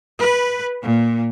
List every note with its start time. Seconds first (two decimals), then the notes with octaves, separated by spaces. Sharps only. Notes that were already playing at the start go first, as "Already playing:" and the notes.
0.18 B4
0.82 A#2